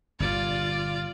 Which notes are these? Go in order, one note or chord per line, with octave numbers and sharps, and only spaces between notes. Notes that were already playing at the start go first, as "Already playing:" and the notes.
G1 G2 A#2 F4 D5